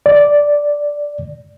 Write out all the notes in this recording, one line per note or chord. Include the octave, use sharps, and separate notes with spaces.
D5